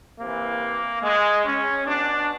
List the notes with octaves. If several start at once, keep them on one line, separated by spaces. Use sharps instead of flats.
C3 E3 A#3
G#3
C#4
B2 D4